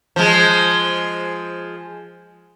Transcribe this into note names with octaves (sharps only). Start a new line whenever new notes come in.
F3 G#3